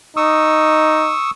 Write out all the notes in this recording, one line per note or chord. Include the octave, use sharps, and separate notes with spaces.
D#4 C#6 D#6 E6